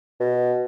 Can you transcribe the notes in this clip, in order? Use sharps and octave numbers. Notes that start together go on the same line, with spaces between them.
B2